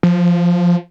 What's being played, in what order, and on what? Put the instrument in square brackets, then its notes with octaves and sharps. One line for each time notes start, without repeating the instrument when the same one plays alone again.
[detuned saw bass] F3